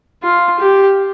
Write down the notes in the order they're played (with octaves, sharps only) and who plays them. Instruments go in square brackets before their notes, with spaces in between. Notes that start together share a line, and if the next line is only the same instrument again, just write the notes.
[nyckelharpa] F4
G4